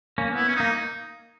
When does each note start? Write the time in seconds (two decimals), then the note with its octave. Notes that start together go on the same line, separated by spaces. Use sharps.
0.18 A#3 C#4
0.32 B3 E4
0.48 C#4
0.55 A#3 D#4